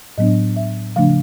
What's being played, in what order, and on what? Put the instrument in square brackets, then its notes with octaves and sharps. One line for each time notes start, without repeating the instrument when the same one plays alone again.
[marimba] A2 F#3 B3 D4 D#5
E5
C#3 F3 A3 D4 F5